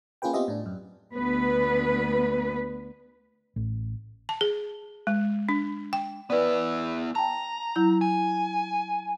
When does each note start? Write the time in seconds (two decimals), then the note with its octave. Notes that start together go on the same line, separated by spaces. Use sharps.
0.22 A#3 C#4 F4 G#4 B4 G5
0.33 B3 C4 F4 G4 D#5 E5
0.48 A2 D4
0.66 F#2
1.13 D2 B3 B4
3.56 A1
4.29 A5
4.41 G#4
5.07 G#3
5.49 D4
5.93 G5
6.30 B3 E4 B4 D5
7.15 G5 A5 A#5
7.76 F#3 E4 G6
8.01 G#5